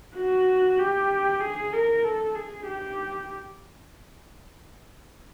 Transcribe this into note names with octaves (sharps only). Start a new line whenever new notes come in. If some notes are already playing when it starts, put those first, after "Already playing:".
F#4
G4
G#4
A#4
A4
G#4
G4